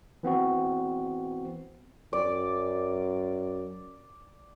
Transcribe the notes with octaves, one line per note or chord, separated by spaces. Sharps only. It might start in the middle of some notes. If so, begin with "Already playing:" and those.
E3 B3 C4 F#4
F#2 D5